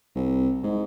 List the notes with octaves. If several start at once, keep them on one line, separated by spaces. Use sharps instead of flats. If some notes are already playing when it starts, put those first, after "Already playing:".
C2
G#2